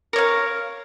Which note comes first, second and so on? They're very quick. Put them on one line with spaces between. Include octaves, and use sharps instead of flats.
A#4 C#5 F5